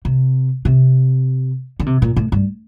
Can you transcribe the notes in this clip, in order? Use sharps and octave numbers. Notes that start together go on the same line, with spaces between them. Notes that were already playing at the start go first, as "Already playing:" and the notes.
C3
C3
D3
C3
A#2
A2
G2